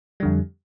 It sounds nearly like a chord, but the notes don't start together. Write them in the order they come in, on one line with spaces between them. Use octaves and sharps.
G3 D3 F2